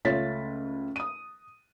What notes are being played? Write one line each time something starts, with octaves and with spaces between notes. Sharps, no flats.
C#2 A3 F4 C#5 A6 B6
D#6 D#7